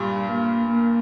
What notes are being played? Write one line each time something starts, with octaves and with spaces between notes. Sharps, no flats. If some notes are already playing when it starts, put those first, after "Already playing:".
Already playing: G2 A#2 G3
A#3
A#3